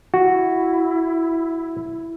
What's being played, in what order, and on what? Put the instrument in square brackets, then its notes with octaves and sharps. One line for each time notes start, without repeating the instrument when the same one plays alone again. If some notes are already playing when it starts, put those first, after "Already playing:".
[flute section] E4 [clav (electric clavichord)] F#4